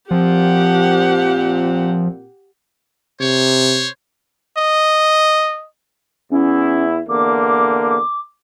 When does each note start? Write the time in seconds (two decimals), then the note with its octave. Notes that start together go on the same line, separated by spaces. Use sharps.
0.11 A#2 F3 C4 G4 F#5
3.20 C3 C5 C#5
4.58 D#5
6.31 E2 C#4 E4
7.09 E2 D3 A#3 D6